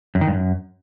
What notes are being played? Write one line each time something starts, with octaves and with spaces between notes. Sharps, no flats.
F#2
D#3
G2
F#2